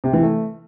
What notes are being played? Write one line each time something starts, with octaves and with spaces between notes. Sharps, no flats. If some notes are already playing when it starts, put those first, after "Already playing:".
C3
E3
A3